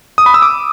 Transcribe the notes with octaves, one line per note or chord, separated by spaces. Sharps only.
D#6
B5
E6
D6